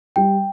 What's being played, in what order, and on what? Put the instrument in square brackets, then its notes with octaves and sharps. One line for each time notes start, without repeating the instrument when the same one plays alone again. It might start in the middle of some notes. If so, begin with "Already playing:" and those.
[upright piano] G3 [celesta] G5